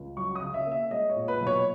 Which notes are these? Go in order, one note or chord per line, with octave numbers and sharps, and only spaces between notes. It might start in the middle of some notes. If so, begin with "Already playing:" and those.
Already playing: C#2
F#3 C#6
D#6
C#3
E5
A#3
E5
G#3 D#5
C#5
A#2
B4
B1
C#5